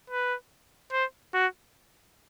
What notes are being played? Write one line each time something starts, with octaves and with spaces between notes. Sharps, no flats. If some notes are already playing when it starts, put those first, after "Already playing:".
B4
C5
F#4